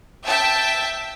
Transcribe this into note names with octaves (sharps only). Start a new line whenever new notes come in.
E5 G5 A5